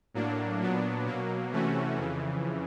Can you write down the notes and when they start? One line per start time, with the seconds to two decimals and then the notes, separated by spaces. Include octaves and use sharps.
0.14 A2 F#3 A#3 D4
0.60 A#2 F#3 B3 D4
1.06 B2 F#3 A#3
1.51 C3 E3 A3 C#4 F#4
1.97 F2 C#3 E3